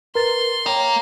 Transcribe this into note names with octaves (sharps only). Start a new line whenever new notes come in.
A#4 B4 C6 A6
C#5 F5 G5 A#5 F7